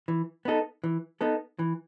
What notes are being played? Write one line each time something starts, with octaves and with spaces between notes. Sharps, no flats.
E3
B3 D#4 A4
E3
B3 D#4 A4
E3